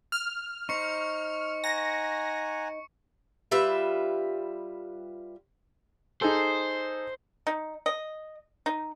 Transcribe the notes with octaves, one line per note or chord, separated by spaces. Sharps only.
F6
D#4 C5 C#6 C#7
F#5 G#5 A#5 A#6
G3 F4 B4 E5
D#4 G#4 A4 C5
D#4
D#5
D#4